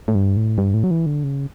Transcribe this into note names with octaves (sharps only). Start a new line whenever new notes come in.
A2
G2
A2
G2
A2
F#3
E3
D3
C#3